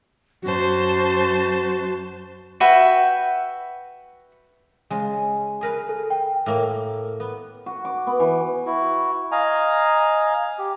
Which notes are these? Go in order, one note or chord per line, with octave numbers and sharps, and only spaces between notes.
F#2 F#4 C5 A5
F#4 B4 E5 G5
C#3 G#3
G#4 A#4 B4
A4
G5
A2 A3 A#3
B3
F#4
D6
B3
E3
E4 F#4
D#5 F5 G#5 A#5
G4